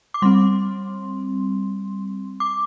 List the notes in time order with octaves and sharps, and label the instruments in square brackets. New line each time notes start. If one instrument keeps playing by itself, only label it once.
[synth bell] D6
G3 C4 C6
D6